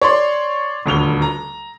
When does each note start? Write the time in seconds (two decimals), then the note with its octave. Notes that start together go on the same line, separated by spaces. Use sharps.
0.02 C#5 D5 C6
0.86 D#1 D2 F7 G7
1.22 A#5